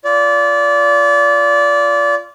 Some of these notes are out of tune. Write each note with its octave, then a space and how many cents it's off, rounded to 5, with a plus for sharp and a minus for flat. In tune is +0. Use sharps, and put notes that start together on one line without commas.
F4 -10 D5 -25